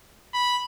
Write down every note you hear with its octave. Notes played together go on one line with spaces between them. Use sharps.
B5